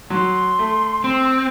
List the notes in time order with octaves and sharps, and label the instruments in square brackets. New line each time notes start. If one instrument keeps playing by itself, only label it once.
[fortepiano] F#3 [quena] C6
[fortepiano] A3
[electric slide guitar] C4